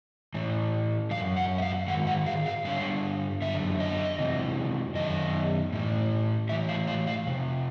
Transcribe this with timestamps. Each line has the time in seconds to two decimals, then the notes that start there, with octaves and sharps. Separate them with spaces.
0.34 A2 E3
1.11 D#3 F5
1.14 F#2
1.36 F#5
1.58 E5
1.62 F5
1.88 G#2 D#3 F#5
2.07 F#5
2.26 F5
2.46 F5
2.65 G2 D3 F5
3.42 F#2 D3 E5
3.80 D#5
4.18 F2 C3 E3
4.95 F#2 D#3 D#5
5.72 A2 E3
6.49 A2 E3 E5
6.69 F5
6.87 F5
7.07 F5
7.27 F2 C3